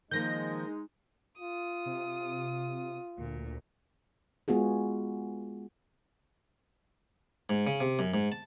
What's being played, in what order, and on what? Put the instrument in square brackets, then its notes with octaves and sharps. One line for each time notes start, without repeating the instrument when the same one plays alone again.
[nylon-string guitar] D#3 F3 A#3 [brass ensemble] G#3 D#4 [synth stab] G6 A#6
[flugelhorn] F4 [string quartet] D#6
[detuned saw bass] C3
[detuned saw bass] D2 [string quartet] A#2
[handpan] G#3 B3 F4 F#4 G#4
[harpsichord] G#2
C#3
C3
F#2
G#2
A5